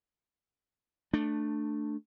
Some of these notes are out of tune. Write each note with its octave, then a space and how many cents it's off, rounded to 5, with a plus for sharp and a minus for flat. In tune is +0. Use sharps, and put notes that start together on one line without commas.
A3 +0 D4 +10